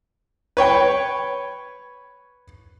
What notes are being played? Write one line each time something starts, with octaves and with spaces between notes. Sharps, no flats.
B4 C#5 G5